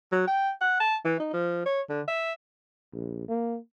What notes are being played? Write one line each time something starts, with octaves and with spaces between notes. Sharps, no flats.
F#3
G5
F#5
A5
E3
D#4
F3
C#5
D3
E5
A#1
A#3